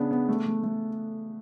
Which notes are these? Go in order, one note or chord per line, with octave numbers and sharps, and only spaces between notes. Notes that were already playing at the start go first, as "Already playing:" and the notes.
Already playing: C#3 B3 D4
B3
A3
A3
A3